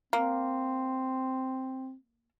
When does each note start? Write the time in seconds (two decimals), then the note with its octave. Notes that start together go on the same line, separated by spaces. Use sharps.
0.13 A#3 C4